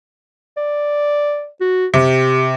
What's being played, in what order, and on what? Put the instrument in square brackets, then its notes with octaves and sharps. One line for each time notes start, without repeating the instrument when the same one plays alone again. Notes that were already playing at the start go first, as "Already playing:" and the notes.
[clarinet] D5
F#4
[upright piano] C3 [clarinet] G4